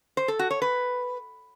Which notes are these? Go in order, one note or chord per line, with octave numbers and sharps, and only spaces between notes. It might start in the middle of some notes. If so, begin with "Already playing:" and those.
C5
A4
F#4
C#5
B4